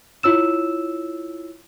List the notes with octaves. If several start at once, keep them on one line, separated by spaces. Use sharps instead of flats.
E4 F4 C#5 E6 E7